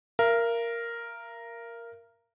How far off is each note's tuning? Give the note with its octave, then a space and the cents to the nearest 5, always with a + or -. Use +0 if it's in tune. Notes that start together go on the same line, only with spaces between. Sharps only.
A#4 +0 F5 -45